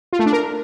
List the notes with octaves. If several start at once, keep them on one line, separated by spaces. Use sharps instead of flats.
F4
A3
D4
A#4